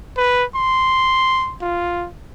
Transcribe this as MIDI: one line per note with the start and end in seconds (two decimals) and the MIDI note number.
0.17 0.44 71
0.55 1.55 84
1.62 2.08 65